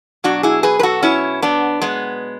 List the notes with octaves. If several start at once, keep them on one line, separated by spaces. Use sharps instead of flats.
B2 F#3 D4 F#4
E4 G#4
G#4 B4
B4
F#4 A4
C#4 E4
B3 D4
G#3 B3